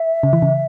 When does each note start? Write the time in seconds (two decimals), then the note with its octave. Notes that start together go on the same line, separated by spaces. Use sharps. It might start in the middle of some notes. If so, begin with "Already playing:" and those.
Already playing: E5
0.23 C#3
0.33 E3
0.42 C#3